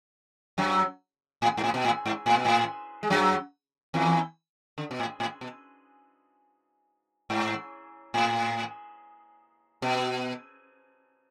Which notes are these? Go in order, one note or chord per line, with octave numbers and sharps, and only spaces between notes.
F#2 F#3
A2
G#2
A2
B2
A2
G#2
A2
B2
A2
G#3
F#2 F#3
E2 E3
D3
B2
A2
A2
B2
G#2
A2
B2